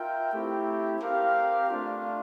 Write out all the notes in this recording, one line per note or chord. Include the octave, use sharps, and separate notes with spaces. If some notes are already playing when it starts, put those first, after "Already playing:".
Already playing: F4 A#4 E5 G5
A3 C4 E4 G4
C4 G4 A#4 F5
A3 D4 F4